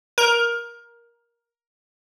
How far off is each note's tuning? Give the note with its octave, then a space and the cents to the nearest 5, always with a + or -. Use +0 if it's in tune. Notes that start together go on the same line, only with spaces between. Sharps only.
A#4 +15